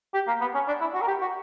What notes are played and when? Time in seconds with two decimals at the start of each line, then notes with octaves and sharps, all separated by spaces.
0.14 G4
0.27 A#3
0.41 B3
0.54 C#4
0.68 D4
0.81 E4
0.94 F#4
1.02 A#4
1.08 G4
1.21 F#4